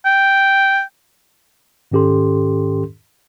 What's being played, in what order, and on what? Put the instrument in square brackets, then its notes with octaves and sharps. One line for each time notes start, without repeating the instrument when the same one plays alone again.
[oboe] G5
[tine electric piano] G#2 D#3 C#4 G4 A4 C6